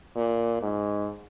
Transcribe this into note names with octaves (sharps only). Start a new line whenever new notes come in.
A#2
G#2